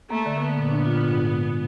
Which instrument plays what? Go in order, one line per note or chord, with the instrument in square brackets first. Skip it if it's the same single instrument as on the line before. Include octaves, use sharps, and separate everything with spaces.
[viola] A3 [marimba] A#3
[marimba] D3
[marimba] A#3 [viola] B3
[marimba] A#2
D4
F4
G#2
G#2
G#3
B2